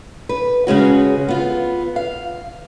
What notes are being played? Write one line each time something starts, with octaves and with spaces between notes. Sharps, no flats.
B4
C#3 G#3 C#4 F#4
B3 F4
F5